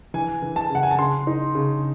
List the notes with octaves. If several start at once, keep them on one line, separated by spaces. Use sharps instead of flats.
E3 G#5
E3
A5
C#3 F#5
G#5
A5
C#3 C6
D#4
C#3